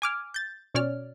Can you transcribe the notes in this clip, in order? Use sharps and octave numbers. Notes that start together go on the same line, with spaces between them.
G#5 D6 F6
G6 A6
B2 C#4 C#5 D5 F6